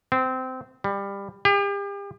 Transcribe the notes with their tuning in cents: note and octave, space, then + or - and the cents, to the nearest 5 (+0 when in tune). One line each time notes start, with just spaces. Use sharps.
C4 -20
G3 +20
G4 +40